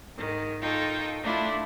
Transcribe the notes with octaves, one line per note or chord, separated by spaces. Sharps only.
G#2 D#3
D#4 F4 A4 G5 C#6 D#6
A3 D4 E4 F4